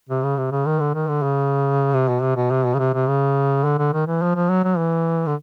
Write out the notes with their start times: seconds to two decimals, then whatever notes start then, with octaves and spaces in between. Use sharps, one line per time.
0.09 C3
0.23 C#3
0.38 C3
0.51 C#3
0.66 D#3
0.80 D3
0.94 D#3
1.08 D3
1.23 C#3
1.93 C3
2.08 B2
2.21 C3
2.36 B2
2.50 C3
2.65 B2
2.74 C#3
2.79 C3
2.94 C3
3.08 C#3
3.64 D3
3.78 D3
3.93 D#3
4.07 E3
4.22 F3
4.35 F3
4.50 F#3
4.64 F#3
4.78 E3
5.27 D3